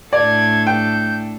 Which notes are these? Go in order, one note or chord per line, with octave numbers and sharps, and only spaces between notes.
A2 D4 A4 D5 G#6
G5 G6